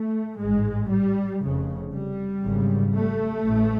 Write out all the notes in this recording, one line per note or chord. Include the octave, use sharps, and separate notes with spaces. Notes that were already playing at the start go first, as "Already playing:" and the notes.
Already playing: A3
A1 G#2 G#3
G3
F1 F2 C#3
G3
G#1 F#2 C#3
A3
A1 A2